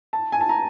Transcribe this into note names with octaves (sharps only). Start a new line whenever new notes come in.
A5
G#5
A5
A#5